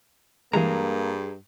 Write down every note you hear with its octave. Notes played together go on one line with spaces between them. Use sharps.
G2 E3 G3 G#3 A#3 G#4 A#5